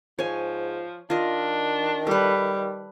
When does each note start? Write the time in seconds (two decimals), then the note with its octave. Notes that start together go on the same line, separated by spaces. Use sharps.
0.19 G#2 F3 C#5 G#5
1.10 D#3 D4 F4 D#5
2.07 G3 A4 B4